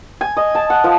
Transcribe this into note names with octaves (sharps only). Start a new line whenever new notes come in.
G#5
D#5
A5
F#5
F3